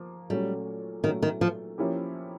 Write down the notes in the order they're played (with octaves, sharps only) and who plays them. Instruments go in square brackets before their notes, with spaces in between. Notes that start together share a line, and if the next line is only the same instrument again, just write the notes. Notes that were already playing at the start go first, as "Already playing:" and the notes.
Already playing: [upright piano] F3 A#3
[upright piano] A#2 F#3 A3 C#4 [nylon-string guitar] G3
[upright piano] A#2 F#3 A3 C#4 [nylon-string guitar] D#3
[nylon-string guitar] D#3
F3
[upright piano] F3 A#3 C#4 E4 G4